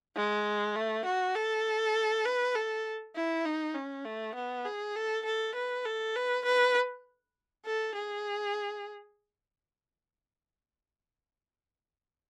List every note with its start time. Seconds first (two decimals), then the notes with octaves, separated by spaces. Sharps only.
0.16 G#3
0.76 A3
1.05 F#4
1.35 A4
2.25 B4
2.55 A4
3.15 E4
3.45 D#4
3.75 C#4
4.05 A3
4.35 B3
4.65 G#4
4.96 A4
5.25 A4
5.55 B4
5.85 A4
6.15 B4
6.45 B4
7.66 A4
7.95 G#4